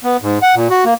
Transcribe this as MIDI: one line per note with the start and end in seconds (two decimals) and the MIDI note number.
0.04 0.17 59
0.22 0.38 44
0.42 0.55 78
0.55 0.68 46
0.70 0.84 66
0.85 0.94 58